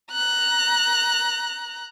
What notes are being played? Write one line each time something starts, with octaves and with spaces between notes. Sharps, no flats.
A#5 F#6